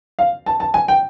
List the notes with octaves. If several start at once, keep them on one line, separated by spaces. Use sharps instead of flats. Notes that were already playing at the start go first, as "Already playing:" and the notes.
F5
A5
A5
G#5
G5